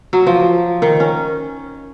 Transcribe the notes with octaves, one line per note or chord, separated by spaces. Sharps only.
F#3
F3
D#3
C#4